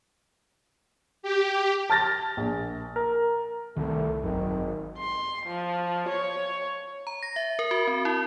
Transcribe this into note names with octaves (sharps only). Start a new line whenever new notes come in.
G4
A5 F6 A6 A#6
A#1
A#4
C2 D#3 A3
G#1 F#2 D#3
C6
F3
C#5
A#5
A#6
E5
A#4
F#4
C4
E4